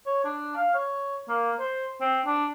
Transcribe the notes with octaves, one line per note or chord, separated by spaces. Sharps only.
C#5
D4
F5
C#5
A#3
C5
C4
D4